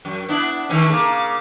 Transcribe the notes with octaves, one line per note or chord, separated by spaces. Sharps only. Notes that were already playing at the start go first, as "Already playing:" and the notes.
F#2
B3 D4 E4
D#3 A3 C#4
C#3 A#3